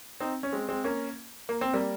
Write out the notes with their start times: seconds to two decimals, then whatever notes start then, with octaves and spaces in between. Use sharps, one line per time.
0.20 C4 D#4
0.43 C#4
0.52 G#3 C4
0.69 G#3 C4
0.84 A#3 C#4
1.49 A#3
1.61 C4
1.73 G3 A#3